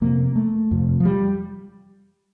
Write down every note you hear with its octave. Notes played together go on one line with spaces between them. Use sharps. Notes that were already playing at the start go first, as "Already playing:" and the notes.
F2 C3 A#3
A3
F2 C3
F3
G3